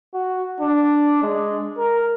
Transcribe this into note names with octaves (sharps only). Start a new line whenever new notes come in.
F#4
D4
G#3
A#4